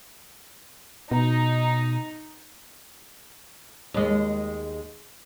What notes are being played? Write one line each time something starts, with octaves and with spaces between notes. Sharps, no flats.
B2 D#4
D#2 G#3